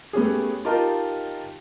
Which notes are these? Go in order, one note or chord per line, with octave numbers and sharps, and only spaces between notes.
A3 B3 C#4 G4 G#4
D#4 F4 G4 A#4 D#5 A5